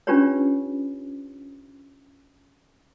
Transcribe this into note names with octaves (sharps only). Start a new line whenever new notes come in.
C#4 D4 F4 G4 B4 C#5